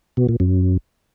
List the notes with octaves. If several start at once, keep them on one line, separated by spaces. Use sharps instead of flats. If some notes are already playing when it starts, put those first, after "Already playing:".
B2
A#2
F#2